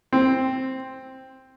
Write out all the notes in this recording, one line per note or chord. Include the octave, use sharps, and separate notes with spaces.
C4